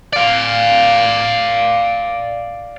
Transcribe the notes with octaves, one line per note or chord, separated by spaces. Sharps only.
D5 F5